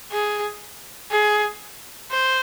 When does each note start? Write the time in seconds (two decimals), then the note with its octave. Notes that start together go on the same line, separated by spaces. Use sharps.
0.12 G#4
1.11 G#4
2.11 C5